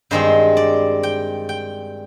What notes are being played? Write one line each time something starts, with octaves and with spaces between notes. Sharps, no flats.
G2 D#3 G#3 C4 C5
D5
G5
G5